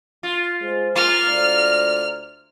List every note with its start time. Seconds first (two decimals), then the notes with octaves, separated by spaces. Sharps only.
0.23 F4
0.62 G#3 C5
0.95 A#3 F4 F6
1.28 D2 C5 D5